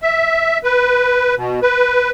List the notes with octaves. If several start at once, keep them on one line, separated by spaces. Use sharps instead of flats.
E5
B4
B2
B4